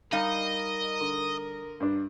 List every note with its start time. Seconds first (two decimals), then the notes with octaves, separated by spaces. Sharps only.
0.12 G3 D#4 A#4 D#5 F5
1.01 D3
1.80 G2 D4